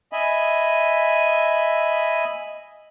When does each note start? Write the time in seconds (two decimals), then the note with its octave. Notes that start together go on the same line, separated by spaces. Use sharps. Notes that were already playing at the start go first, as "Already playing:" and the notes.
0.13 D#5 E5 G#5 B5